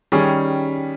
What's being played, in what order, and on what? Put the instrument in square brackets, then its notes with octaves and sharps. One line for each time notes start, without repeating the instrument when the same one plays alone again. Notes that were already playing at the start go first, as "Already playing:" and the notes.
[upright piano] D#3 G3 C#4 G#4